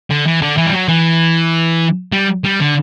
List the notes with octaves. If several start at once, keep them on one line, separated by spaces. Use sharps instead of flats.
D3
E3
D3
E3
G3
F#3
E3
G3
G3
D3